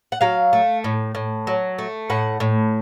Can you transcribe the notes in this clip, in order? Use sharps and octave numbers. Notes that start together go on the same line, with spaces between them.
F#5
F#3 F5
A3
A2
A2
F#3
A3
A2 F#5
A2